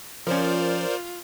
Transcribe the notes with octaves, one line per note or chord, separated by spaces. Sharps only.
F3 C#4 F4 A#4 C5 D5